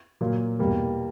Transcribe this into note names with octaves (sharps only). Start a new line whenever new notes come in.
A#2 F#3 A#3
E2 B2 G3 A#3